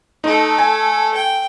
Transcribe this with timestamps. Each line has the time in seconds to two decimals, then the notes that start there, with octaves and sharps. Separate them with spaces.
0.24 A3 D#4 A4
0.58 G#5
1.14 G5